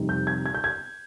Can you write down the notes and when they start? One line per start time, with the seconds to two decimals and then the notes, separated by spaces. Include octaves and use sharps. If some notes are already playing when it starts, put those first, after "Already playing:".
Already playing: F2 C3 G3 C4 D#4
0.09 G6
0.27 G#6
0.46 G#6
0.55 G6
0.64 G#6